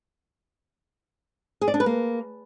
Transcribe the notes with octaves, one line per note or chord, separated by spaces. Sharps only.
G#4
D5
D4
B4
A#3